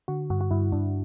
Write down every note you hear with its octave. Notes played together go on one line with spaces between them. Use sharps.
D3 F#4
G2 F#4
F#4
G2 E4
G2 D4